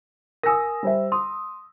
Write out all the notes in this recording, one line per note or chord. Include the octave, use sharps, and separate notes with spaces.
A#4 G#5 D#6 E6 A#6
G3 C5 E5
C6 D#6